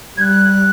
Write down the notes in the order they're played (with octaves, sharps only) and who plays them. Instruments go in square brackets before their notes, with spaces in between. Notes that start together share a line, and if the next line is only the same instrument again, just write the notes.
[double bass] G3 [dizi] F#6 G#6